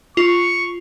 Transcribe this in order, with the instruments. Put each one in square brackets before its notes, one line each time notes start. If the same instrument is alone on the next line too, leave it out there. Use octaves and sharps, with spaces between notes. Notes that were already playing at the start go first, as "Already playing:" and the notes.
[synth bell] F4 [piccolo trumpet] C#6